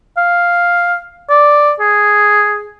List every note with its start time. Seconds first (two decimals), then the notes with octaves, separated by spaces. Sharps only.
0.17 F5
1.30 D5
1.80 G#4